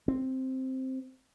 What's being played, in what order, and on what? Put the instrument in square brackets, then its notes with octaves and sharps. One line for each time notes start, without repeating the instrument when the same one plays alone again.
[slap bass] C4